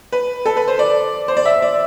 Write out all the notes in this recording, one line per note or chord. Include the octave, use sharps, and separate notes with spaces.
B4
A4
B4
C5
D5
C5
D5
E5
D5